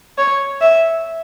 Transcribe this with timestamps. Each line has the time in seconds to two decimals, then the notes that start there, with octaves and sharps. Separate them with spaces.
0.18 C#5
0.61 E5